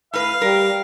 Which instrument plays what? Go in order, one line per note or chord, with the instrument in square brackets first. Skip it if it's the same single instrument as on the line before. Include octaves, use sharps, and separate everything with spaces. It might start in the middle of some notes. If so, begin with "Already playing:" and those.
[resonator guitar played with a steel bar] A2 B4 [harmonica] F5
[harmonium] G3 [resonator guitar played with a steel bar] A#4